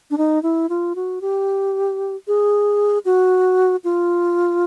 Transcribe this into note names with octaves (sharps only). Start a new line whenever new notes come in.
D4
D#4
E4
F4
F#4
G4
G#4
F#4
F4